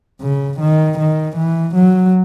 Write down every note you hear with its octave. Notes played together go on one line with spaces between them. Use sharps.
C#3
D#3
D#3
E3
F#3